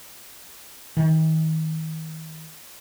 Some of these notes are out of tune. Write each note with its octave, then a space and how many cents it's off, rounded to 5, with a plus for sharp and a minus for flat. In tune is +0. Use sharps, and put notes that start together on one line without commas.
D#3 +35